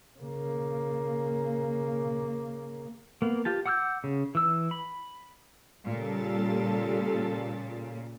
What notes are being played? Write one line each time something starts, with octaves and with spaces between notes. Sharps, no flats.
C#3 A#3
A#3 B3
F4 G4 A5
F#5 D6 E6 F6 G6
C#3
E3 E6
B5
A#2 C#3 G3 A4 A6